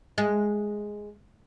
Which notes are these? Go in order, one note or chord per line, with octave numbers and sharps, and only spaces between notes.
G#3